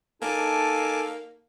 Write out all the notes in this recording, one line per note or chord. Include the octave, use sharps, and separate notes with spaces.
A#3 D#4 A4 G#5 A5 D6